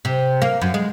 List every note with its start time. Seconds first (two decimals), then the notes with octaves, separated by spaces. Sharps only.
0.05 C3
0.42 A#3
0.62 F#2
0.74 G#3